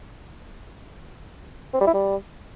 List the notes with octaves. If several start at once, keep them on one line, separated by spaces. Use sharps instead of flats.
C4
G3
E4
G3